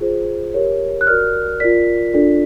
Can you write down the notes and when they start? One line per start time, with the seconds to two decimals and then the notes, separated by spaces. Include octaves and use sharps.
0.01 F4 G#4 C5
0.54 G4 A#4 C#5
1.01 F#6
1.07 F#4 A#4 D5 F6
1.60 F4 A#4 D5 B6
2.14 D4 F4 A4 D5